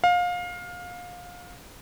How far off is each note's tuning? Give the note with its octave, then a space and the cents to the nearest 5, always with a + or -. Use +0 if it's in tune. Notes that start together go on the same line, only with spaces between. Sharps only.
F5 +25